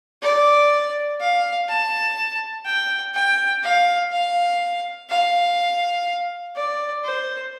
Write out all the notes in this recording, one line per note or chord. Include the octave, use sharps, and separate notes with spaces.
D5
F5
A5
G5
G5
F5
F5
F5
D5
C5